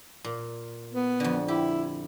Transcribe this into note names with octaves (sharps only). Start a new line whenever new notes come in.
A#2
B3
F2 D3
E4 G4